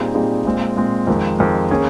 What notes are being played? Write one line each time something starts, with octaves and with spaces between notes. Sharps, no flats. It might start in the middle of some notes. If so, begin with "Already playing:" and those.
Already playing: A#2 G3 C4 D#4 G#4
A#2 G3 C4 D#4 G#4
A#2 G#3 C4
A#2 G#3 C4
F2 D#3 G#3
F2 D#3 G#3
D#3 A#3 C#4 G#4